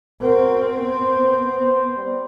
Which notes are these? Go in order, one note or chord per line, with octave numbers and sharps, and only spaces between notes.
C4 F#4 A#4
B3 C5
C5
G3